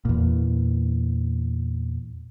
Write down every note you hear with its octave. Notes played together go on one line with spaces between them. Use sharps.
E2 A#2